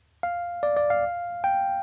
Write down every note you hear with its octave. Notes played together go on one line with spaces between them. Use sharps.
F5
D5
D5
F5
G5